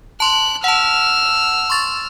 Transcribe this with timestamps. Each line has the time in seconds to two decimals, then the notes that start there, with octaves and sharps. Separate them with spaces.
0.20 A5 C6 F#6
0.64 F#5 A5 E6 F6
1.70 C6 C#6 A6